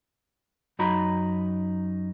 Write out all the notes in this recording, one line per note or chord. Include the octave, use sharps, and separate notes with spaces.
F#2 D#4 F#4 A#5 B5